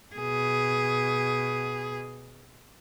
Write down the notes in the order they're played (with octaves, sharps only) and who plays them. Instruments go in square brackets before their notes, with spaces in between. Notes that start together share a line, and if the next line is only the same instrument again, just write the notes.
[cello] B2 G#4